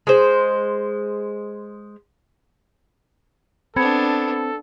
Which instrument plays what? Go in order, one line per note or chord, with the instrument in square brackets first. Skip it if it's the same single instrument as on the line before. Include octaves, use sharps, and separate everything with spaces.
[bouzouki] G#3 C5
[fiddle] B3 D4 [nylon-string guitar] C4 [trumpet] A4 [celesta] B5 G#6 C#7